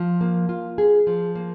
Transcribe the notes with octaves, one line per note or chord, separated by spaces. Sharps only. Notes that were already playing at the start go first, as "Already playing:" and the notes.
Already playing: F3
A#3
F4
G#4
F3
A#3